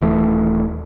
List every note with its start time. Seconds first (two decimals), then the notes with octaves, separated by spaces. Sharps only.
0.01 D#1 E3 A3